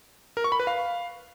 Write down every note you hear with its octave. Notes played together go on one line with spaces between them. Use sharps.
A#4
C#6
B5
B4
F5